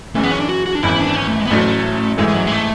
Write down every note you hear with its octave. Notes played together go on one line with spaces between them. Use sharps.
F#1 F#2 C#3 E3 A3
B3
C#4
D4
F#4
F#4
D4
G#1 F#2 E3 B3 E4
D4
C#4
A3
G#3
B3
A1 A2 F#3 A3 C#4
G#2 E3 G#3 A3 E4
G#3
F#3
G#3
A3